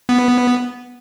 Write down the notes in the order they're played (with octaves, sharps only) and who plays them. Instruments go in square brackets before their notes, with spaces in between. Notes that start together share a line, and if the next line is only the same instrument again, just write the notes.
[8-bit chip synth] B3